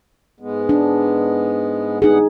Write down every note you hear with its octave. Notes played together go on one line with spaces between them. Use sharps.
G#2 G#3 B3
D4
G2 B3 D#4 G#4 F#5